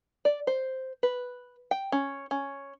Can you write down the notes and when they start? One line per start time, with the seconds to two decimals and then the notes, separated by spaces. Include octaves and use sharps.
0.25 D5
0.47 C5
1.03 B4
1.71 G5
1.92 C#4
2.31 C#4